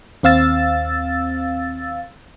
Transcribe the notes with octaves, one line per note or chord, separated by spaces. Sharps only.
D#2 C4 F5 E6 A6